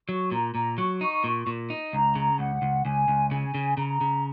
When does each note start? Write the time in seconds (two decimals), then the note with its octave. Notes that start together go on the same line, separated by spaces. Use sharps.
0.08 F#3 C#6
0.32 A#2 A#5
0.55 A#2 A#5
0.78 F#3 C#6
1.01 D#4 C#6
1.24 A#2
1.47 A#2
1.70 D#4
1.93 C#2 A#5
2.15 C#3
2.39 C#2 F#5
2.62 C#2
2.85 C#2 G#5
3.08 C#2
3.31 C#3 G#5
3.54 C#3
3.77 C#3 A#5
4.01 C#3